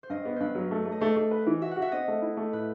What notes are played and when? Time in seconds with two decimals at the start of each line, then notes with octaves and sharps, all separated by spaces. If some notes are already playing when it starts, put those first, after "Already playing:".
0.03 C5
0.10 G2 D#5
0.25 B3
0.36 G2 B4 C5
0.55 F#3
0.71 A3
0.86 A3
0.92 D#5
1.00 A3 C5
1.16 A3
1.31 B4
1.47 E3
1.61 F#4 E5
1.71 F#5
1.76 F#4
1.82 E5
1.92 C4 D#5
2.08 A3
2.22 E4
2.37 A3
2.53 A2 B4